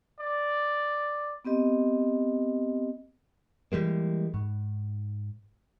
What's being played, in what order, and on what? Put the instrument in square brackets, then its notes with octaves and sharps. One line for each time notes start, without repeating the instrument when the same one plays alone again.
[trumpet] D5
[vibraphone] B3 C4 G4 D#5
[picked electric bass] E3 G3 G#3 A#3
G#2